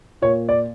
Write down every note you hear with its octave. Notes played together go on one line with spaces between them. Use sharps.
A#2 C#5
D5